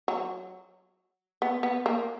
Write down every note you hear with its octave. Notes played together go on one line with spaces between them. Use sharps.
F#3
B3
B3
A#3